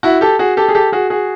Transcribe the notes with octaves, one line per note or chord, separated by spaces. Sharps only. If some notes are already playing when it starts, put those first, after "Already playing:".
E4 F#4
G4 A4
F#4 G#4
G4 A4
G#4
G4 A4
F#4 G#4
F#4 G#4